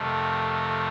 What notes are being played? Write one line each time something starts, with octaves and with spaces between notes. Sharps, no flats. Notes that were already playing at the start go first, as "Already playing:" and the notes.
Already playing: F2 C3 D#3 A3